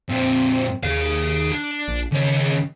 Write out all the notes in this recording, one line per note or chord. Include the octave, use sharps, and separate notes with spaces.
F2 A#2 C4
D#2 G#4 F5
D4
A#1
D#2 C#3 C#5